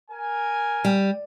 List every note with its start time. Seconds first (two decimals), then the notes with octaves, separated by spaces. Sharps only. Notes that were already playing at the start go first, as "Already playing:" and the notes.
0.10 A#4 G#5
0.85 G3